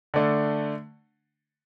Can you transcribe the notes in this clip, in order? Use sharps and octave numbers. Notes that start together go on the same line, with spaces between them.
D3 A3 D4